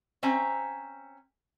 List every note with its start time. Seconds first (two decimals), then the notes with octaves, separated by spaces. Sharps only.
0.23 C4 C#4 C5 E5 G#5 A#5